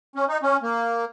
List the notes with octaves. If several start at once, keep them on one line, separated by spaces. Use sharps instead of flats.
C#4
D#4
C#4
A#3